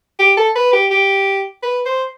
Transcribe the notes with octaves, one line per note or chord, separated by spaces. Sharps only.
G4
A4
B4
G4
G4
B4
C5